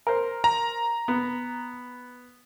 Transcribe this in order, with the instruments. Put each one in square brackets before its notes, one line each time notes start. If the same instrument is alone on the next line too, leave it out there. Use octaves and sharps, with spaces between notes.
[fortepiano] A#4 C5
[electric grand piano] A#5
[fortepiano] B3